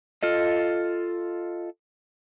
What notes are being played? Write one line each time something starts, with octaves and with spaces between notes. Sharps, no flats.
F4 A4 D#5